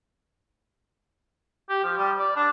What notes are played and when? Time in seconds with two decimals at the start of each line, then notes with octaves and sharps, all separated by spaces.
1.69 G4
1.84 F3
1.97 G3
2.19 D5
2.36 D4